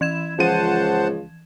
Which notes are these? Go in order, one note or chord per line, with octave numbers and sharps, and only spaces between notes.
E3 E4 G#6 E7
C#2 F3 C5 F#5 A5 D#7